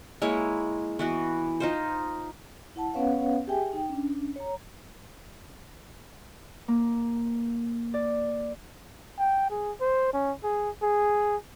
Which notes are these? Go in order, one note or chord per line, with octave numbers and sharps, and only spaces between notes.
G#3 A#3 E4 C#5
E3 B3 F#4
D#4 F4 C5
E4 F#5 A5
B3 C#4 B4 C#5 F5 F#5
G4 G#4 E5 G5 G#5
D#4 G5
C#4 D4
C#5 A#5
A#3
D5
G5
G#4
C5
C#4
G#4
G#4